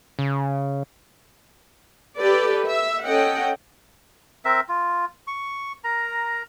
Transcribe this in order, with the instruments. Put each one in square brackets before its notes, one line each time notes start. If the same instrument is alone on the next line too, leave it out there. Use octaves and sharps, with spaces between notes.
[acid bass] C#3
[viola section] G4 A4 B4 D5
E5
C#4 A4 D#5 F#5 G5
[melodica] C4 A#4 E5
F4
C#6
A#4 A#5